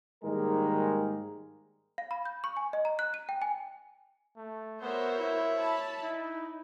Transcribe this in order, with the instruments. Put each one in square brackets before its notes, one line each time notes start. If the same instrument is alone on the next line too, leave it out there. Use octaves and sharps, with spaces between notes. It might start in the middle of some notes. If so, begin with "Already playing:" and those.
[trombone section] G#2 D#3 G3 G#3 A#3 A#4
[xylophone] F5
B5
G6
C#6
G#5
D#5
A#5
F#6
D#7
G5
G#5
[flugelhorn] A3
[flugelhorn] B3 [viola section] F#4 A#4 C5 [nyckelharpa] C#5 E5
[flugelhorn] E4
[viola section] A5 B5
[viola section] D#4 [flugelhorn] E4